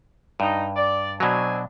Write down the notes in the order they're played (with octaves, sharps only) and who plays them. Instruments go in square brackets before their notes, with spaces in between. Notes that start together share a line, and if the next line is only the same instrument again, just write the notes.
[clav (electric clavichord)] G2 [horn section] D#4
[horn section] D5
[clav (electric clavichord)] B2 F#3 [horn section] C4 D4 G#5